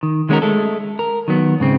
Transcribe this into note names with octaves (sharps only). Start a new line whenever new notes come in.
D#3
D#3 G#3 B3 C#4 F#4 A#4
G#3 A3 A4
A#4
D#3 F#3 B3
G#2 C#3 C4